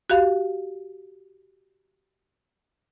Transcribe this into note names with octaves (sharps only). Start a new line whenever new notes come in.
F#4 G4 F5